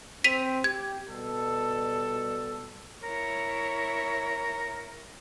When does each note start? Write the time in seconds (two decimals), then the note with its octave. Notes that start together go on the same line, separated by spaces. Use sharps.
0.24 C4 B6 D#7 F7
0.64 G4 G#6
1.08 B2 G3 A4
3.04 E4 A#4 C#5